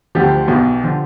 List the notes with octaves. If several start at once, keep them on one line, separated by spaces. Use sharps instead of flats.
D2 D3 F3 G4
B1 B2
D3 F3